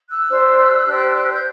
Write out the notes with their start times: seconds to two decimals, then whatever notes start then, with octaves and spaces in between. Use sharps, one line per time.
0.09 E6 F#6
0.29 D4 G4 C5
0.86 D4 G4 C5
1.31 G6